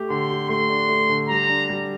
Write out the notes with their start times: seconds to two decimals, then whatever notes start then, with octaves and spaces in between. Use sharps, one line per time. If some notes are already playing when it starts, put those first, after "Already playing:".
Already playing: A3 G4
0.10 D3 C6
0.30 G4
0.49 A3 C6
0.70 D4
0.89 A3
1.09 D3
1.29 G3 A#5
1.49 D4
1.69 G3